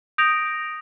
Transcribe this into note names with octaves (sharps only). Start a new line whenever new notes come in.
D#6 G6 A#6 D7 F7